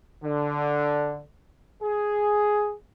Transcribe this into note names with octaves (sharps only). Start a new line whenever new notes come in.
D3
G#4